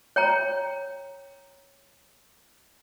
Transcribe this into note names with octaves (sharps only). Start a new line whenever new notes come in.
C#5 G5 A#5